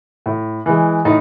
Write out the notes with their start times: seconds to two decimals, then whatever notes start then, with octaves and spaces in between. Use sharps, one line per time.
0.26 A2
0.66 E3 G#3
1.05 A2 D#4